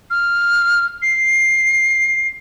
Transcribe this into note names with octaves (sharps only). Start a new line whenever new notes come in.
F6
C7